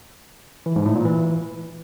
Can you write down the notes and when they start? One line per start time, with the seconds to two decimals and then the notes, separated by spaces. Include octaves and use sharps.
0.66 E3
0.76 G#2
0.86 A2
0.95 A#2
1.05 E3